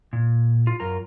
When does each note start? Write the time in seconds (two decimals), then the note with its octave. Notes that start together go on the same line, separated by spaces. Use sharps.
0.13 A#2
0.67 F4
0.80 F#2 F4 A#4 A#5